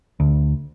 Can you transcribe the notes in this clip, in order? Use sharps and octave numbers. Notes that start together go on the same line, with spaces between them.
D2